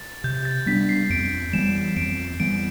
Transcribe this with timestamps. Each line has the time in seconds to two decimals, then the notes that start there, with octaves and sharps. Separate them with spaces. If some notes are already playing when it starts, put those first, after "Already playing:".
Already playing: A6
0.24 C3 G6
0.45 A6
0.66 G3 B3 D4 B6
0.89 C7
1.10 F2 D7
1.53 E3 G3 B3 E7
1.96 F2 D7
2.40 E3 G3 B3 D7